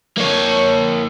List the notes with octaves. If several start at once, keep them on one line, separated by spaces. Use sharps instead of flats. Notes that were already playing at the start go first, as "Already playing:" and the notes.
A#3 C#5